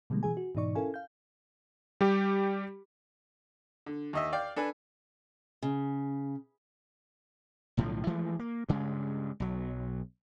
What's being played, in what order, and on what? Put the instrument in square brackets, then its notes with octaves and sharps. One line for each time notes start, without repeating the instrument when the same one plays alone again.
[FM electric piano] B2 D3 F3 G3 G#3 A#3
B2 E3 G#4 G#5
F#4
G#2 B2 E3 D#4 D5 C#6
C#4 E4 A4 A#4 F5 G#5
F5 G6
[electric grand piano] G3 G4
[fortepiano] D3
D#2 D#5 E5
D5 F5 G5
D4 A4 B4 G#5
[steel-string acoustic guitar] C#3
[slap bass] B1 A2 D3 F3
E3 F3 G#3 A3
A#3
G2 C#3 G#3
B1 F#3